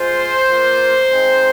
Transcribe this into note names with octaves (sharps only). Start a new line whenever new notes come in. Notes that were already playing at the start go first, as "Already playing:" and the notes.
Already playing: G#3 F4 C5
A#3 F4
G#3 C4 D#4